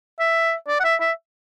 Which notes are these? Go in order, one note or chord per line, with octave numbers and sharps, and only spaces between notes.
E5
D5
F#5
E5
E5